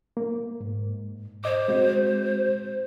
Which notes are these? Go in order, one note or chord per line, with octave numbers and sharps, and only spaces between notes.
A#3
G#2
C5 D#5 D6
G#3 C4 F#4